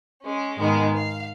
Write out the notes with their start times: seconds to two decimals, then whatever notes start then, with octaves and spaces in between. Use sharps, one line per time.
0.21 G#3 C#4
0.57 G#2 D#3 G#3 B3
0.95 F5